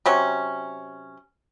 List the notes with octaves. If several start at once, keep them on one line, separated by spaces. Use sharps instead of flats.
C3 F#3 C#4